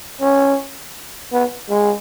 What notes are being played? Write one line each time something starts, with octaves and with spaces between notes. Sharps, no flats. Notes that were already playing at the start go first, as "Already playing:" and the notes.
C#4
B3
G#3